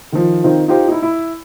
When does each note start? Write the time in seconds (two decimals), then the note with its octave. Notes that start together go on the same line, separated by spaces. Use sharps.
0.13 D#3 F3
0.44 D#3 C4 D#4 F4
0.68 D#4 F4 G4 C5
0.88 D#4 E4
1.02 E4